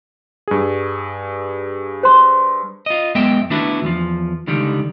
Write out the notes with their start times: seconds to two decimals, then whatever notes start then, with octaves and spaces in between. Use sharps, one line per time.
0.48 G2 G#4
2.03 C5 C6
2.86 F4 D#5
3.15 F#2 G#3 B3 D#5 E5 G5
3.50 D#3 A3 B3 D4 E4 F#4
3.83 E2 F3
4.47 C#2 D3 D#3 G3